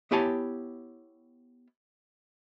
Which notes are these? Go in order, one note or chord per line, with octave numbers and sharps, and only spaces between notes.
B3 E4 G4 C#5 G#5 A5